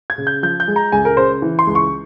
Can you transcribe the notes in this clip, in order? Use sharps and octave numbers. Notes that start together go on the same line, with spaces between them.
G#6
C#3
G6
F3 G6
G6
G#3
A#5
C#2 G#5
A#4
C#3 C5
E3
C6
C#2
C#6